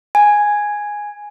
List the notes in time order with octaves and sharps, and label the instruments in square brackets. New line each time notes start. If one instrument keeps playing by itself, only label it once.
[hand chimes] G#5